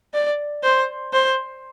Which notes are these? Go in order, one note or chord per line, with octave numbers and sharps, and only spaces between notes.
D5
C5
C5